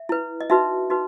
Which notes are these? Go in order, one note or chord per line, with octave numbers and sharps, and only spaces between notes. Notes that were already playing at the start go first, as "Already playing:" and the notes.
Already playing: E5
E4 B4
D#5
D#4 F#4 B4 E5
D#4 F#4 B4